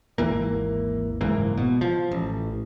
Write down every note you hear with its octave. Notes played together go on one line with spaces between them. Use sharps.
G#1 D#2 E3 A#3
F#1 G#2 E3 A#3
B2
F3
A1